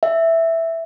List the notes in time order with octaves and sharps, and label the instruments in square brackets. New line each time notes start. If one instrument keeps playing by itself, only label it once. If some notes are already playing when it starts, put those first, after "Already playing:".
[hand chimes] E5